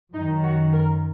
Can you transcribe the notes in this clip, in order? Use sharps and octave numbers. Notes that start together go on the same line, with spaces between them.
F#2 D#3 D#4
F#4
A#4